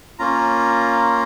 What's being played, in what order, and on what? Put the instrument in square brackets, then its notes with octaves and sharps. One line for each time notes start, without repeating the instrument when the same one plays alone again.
[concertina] A#3 C#4 F4 A#5